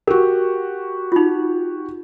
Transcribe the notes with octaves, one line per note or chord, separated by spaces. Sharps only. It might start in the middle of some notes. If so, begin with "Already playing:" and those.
F#4 G4 A#4
D#4 F4